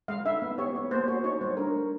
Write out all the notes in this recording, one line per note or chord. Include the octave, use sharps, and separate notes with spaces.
G#3 F5
D#4 E5
B3
G4 C#5
B3
A#3 C5
F#4 C#5
D#4 C#5
G3 C5
D4 A#4
A3